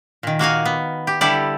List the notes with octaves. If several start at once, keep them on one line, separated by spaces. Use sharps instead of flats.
A#2 D#3
A#3 F#4 F5 G#5
B3
G4
D3 G3 E4 G4 A4 D5